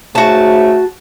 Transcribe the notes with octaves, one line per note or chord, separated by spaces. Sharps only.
G#2 C#3 A3 F#4 A5